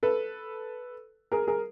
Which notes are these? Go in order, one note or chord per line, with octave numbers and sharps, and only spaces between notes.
A4 B4
G#4 A#4
G#4 A#4